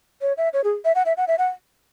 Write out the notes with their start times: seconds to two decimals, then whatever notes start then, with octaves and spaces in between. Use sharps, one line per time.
0.22 C#5
0.37 E5
0.53 C#5
0.64 G#4
0.85 E5
0.95 F#5
1.06 E5
1.17 F#5
1.28 E5
1.38 F#5